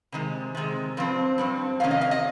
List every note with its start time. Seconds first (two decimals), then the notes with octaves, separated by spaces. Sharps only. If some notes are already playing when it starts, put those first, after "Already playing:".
0.12 C3 D#3 G#3
0.55 C3 D#3 G#3
0.97 G2 F3 C4
1.38 G2 F3 C4
1.80 C3 D#3 A#3 C#4 F5
1.91 D#5
2.01 F5
2.11 D#5